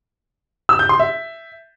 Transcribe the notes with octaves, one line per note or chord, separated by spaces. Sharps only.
E6
G6
C6
E5